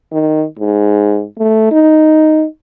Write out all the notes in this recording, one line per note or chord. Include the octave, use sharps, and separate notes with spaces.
D#3
G#2
A3
D#4